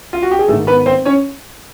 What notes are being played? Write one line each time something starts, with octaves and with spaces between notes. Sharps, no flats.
F4
F#4
G4
G#4
G#1 G#2 D#3 A3 A4
B3 B4
C4 C5
C#4 C#5